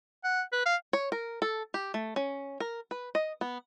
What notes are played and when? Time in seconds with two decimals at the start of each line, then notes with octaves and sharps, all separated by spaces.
0.24 F#5
0.52 B4
0.66 F5
0.93 C#5
1.12 A#4
1.42 A4
1.74 G4
1.94 A3
2.16 C#4
2.60 A#4
2.91 B4
3.15 D#5
3.41 B3